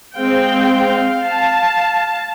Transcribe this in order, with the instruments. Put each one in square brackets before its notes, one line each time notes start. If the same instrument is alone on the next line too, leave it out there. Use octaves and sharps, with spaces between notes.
[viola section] G#3 C4 G5 [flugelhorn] F5
[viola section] A5